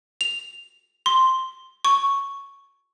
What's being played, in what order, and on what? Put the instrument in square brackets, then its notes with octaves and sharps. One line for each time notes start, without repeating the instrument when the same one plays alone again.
[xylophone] F7
C6
C#6